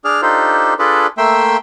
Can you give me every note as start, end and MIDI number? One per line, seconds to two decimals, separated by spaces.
0.05 0.21 62
0.05 0.21 68
0.05 0.21 74
0.05 0.21 89
0.22 0.74 62
0.22 0.74 63
0.22 0.74 65
0.22 0.74 67
0.22 0.74 69
0.22 0.74 72
0.79 1.07 62
0.79 1.07 65
0.79 1.07 68
0.79 1.07 69
0.79 1.07 71
0.79 1.07 74
1.18 1.57 57
1.18 1.57 58
1.18 1.57 76
1.18 1.57 79
1.18 1.57 84
1.18 1.57 88